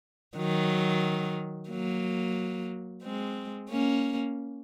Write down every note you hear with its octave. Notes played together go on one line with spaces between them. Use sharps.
D#3 F#3
F#3 A#3
G#3 C4
A#3 C#4